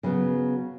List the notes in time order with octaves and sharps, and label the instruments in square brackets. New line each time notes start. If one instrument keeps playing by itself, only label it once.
[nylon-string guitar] C#3 F#3 B3